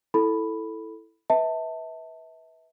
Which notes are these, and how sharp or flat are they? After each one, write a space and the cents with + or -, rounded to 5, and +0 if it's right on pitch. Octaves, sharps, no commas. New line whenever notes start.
E4 +0 A4 +0 B5 +0
B4 -15 E5 -35 A5 +20